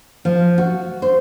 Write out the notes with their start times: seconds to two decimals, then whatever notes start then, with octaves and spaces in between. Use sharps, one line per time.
0.25 F3
0.58 F#4
1.02 C5